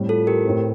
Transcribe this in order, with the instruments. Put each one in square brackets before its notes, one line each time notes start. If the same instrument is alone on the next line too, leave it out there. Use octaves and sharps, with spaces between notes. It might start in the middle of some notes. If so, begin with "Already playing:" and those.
Already playing: [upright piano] A2 G3 C4
[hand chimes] F4 A4
G4 A#4
[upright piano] A2 A3 C4